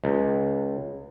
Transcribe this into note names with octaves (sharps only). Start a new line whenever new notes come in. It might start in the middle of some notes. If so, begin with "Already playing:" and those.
C#2